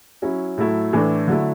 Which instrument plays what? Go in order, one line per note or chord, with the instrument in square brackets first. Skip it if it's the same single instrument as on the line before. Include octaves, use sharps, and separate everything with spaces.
[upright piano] F#3 C#4 E4
A2 F#3 A3 E4
A2 E3 A3 D4
D3 F#3 A3 E4